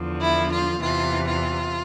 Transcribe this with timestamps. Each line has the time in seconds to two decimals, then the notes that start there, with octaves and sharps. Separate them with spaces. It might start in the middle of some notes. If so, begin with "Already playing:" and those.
Already playing: E2 D3 F3
0.20 E4
0.51 F4
0.82 E2 C3 E3 F4
1.27 F4